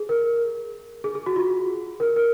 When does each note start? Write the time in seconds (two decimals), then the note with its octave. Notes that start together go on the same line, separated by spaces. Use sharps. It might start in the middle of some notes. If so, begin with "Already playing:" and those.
Already playing: G#4
0.09 A#4
1.04 G#4
1.15 G#4
1.26 F#4
1.36 F4
2.00 A#4
2.16 A#4